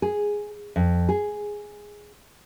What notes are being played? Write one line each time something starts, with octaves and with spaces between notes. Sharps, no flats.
G#4
F2
G#4